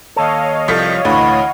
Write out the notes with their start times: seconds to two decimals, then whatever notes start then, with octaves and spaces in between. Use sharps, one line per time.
0.16 D#2 A4 C#5 D#5 F5
0.68 C2 F3 G3 A4 B6
1.05 D2 A2 E3 F#5 B5 C#6